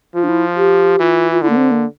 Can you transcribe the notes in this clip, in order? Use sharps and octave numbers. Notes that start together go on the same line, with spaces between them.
F3 F4
D4
E4
G4
E3 F4
F4
D3 E4
A#3
C4
A#3